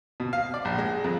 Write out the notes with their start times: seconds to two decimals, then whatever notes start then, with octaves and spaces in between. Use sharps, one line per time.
0.20 B2
0.33 F5
0.54 D5
0.65 A#1
0.78 G#3
1.04 F2